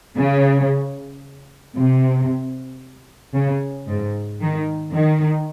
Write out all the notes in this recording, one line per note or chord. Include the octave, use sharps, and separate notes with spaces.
C#3
C3
C#3
G#2
D#3
D#3